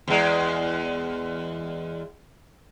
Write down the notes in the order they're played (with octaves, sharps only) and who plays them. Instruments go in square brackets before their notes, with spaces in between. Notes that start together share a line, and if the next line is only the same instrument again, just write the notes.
[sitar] E2 G#3